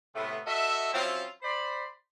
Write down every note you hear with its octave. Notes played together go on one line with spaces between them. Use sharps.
A2 C3 A3 B3
F#4 A4 D#5 E5
F3 F#3 C4 C#4 E4 F4
C5 D5 B5